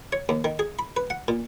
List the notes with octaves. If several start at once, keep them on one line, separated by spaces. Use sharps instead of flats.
C#5
D#2
D#3
G#4
B5
B4
F#5
A#2